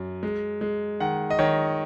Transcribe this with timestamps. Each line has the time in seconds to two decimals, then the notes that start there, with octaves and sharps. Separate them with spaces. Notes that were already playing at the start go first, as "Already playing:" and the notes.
Already playing: F#2
0.23 G#3
0.61 G#3
1.00 D#3 F#5
1.30 D#5
1.39 D#3 C#5